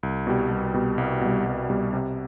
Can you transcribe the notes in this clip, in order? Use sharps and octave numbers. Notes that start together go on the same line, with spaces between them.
C2
B2 G3
C2
B2 G3
C2
B2 G3
C2
B2 G3
C3